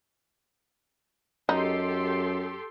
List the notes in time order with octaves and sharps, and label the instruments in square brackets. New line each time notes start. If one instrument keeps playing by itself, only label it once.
[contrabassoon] F#2 [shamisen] D#4 [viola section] G4 A4 C6